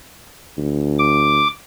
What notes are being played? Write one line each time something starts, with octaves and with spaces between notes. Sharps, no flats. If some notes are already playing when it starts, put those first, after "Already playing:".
D2
D6